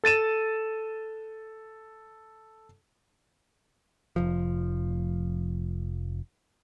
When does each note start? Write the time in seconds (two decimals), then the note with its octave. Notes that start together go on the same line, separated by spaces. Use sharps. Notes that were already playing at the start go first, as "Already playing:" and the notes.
0.04 A4 A6 D#7 E7
4.16 F1 F3